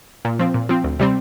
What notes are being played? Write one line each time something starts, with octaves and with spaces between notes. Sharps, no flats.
A#2
F3 C4
A#2
F3 C4
D2
C3 G3 C4